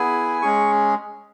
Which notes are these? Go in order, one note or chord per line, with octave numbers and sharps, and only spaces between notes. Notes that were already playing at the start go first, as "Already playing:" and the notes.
Already playing: B3 E4 G#4 G#5
G#3 C#4 G#4 C#6